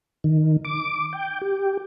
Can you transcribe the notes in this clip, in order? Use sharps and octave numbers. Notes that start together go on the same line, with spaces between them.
D#3
D6
G5
G4